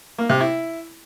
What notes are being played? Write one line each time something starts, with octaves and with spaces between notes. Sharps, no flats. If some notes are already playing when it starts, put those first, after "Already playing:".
A#3
C3
E4